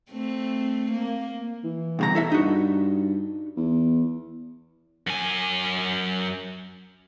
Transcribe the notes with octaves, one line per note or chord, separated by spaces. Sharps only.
A3 C4
A#3
E3
C2 B2 A#5
E4 A4 E5
G2 D#4 F#4
E2
F#2 G#5